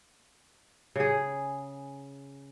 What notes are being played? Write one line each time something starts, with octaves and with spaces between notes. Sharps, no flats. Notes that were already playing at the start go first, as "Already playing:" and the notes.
C#3 G#4